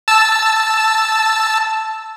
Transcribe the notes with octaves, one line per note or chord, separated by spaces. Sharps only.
A5 E6